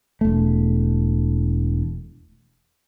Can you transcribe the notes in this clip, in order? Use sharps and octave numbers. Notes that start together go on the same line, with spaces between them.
E1 A3